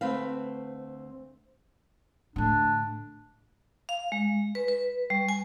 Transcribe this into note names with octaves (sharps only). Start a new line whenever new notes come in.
D2 A3 C4 B4 F5
A2 D3 D4
F5
G#3
B4
B4
G3
G#5